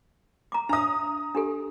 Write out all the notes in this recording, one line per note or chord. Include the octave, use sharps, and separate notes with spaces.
A#5 D6
D4 E5 A#5 D#6
D4 G4 A4